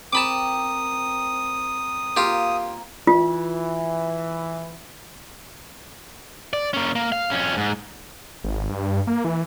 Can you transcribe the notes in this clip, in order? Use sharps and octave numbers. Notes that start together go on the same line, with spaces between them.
C4 A#4 A5 B5 D6 D#6
A#3 F4 G4
E3 F4
D5
A#3 C#4
A#3
F5
F2 C#4
G#2
G#1
G2
A#3
E3